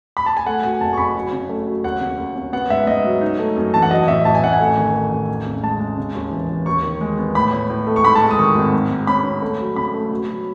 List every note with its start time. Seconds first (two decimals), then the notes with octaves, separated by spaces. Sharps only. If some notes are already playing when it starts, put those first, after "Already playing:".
0.17 B5
0.26 A5
0.37 G#5
0.46 A3 F#5
0.63 B2 G#5
0.81 F#1 A5
0.93 C#6
0.97 F#1 B5
1.15 F#3
1.32 C#3
1.49 A3
1.67 F#3
1.84 D#2 F#5
2.01 C#3
2.18 D#2
2.36 C#3
2.53 B3 F#5
2.70 G#2 E5
2.87 G#2 D#5
3.05 F#3
3.21 D#4
3.39 A3
3.57 F#2
3.74 E3 A5
3.82 F#5
3.91 F#3 D#5
4.08 A1 E5
4.25 A1 A5
4.35 G#5
4.42 A1 F#5
4.53 G#5
4.60 A3
4.77 D#3
4.94 A3
5.12 A1
5.29 E2
5.46 C#3
5.63 G#3 A5
5.80 G#3
5.97 C#3
6.15 D#2
6.31 E3
6.49 E3
6.66 D#2 C#6
6.83 D#3
7.01 G#3
7.18 B3
7.35 A2 B5
7.53 A2
7.70 A2
7.87 A3
7.96 C#6
8.04 G#2 B5
8.15 A5
8.22 G#3
8.31 D#6
8.39 D#3 C#6
8.55 G#1
8.73 G#2
8.90 G#2
9.07 C#4 B5
9.24 C#4
9.42 A3
9.59 F#3
9.76 C#3 B5
9.94 A3
10.11 B2
10.28 F#3